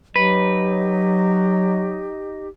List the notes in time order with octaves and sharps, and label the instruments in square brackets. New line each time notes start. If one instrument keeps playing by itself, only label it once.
[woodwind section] F#3 [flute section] D#4 G4 D#5 [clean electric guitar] B4